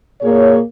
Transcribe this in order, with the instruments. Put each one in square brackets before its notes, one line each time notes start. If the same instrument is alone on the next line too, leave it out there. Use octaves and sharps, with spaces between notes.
[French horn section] A#2 A#3 G#4 C#5